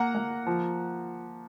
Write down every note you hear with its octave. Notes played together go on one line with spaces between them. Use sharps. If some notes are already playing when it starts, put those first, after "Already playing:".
Already playing: A#3 F#5 A#5
A#3
F3